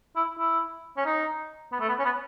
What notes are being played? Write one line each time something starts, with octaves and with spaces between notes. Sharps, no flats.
E4
E4
C#4
D#4
B3
A3
B3
C#4
B3